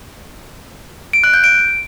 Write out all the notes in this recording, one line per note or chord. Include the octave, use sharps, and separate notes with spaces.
D7
F#6
G6
D7